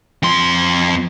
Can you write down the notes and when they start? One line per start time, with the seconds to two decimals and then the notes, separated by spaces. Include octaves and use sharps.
0.23 F2 C6